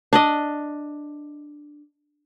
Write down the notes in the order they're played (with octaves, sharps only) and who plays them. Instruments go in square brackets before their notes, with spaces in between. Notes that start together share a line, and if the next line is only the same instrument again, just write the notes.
[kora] D4 D5 D#5